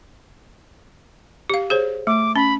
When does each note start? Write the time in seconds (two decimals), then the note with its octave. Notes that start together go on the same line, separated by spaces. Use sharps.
1.50 G4 F5
1.70 G#4 C5 C#5
2.07 A3 D6
2.36 C#4 B5